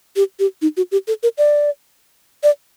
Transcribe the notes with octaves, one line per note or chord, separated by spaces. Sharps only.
G4
G4
D#4
F#4
G4
A4
A#4
D5
D5